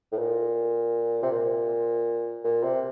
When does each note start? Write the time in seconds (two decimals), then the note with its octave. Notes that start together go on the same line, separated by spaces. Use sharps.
0.12 A2
0.18 A#2
1.23 C3
1.31 A#2
2.44 A#2
2.63 C3